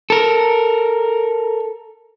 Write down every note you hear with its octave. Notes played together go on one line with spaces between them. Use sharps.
A4 A#4